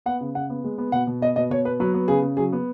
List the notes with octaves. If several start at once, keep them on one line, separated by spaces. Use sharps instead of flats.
B3 F#5
C#3
C#3 F#5
B3
G#3
B3
B2 F#5
B2
B3 D#5
B2 D#5
B2 C#5
B3 B4
F#3 B4
B3
C#3 G#4
C#3
F#3 G#4
B3